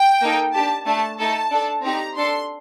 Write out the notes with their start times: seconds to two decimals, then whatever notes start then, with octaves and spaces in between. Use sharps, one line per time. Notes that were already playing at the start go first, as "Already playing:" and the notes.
Already playing: G5
0.21 A#3 D#4 A4
0.54 D4 G4 A5
0.86 A3 D4 A4 A5
1.18 A3 D#4 A4 A5
1.51 D4 A4
1.83 C4 D#4 G4 A#5
2.15 D4 A4 C6